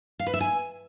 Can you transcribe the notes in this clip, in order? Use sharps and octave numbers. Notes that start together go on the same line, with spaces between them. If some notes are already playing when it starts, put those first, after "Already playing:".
F5
B4
E5
G#5